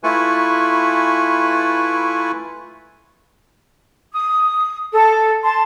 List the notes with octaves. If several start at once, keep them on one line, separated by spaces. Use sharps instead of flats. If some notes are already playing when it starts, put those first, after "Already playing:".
A3 E4 F4 B4 G#5 C#6
D#6
A4
A5 C6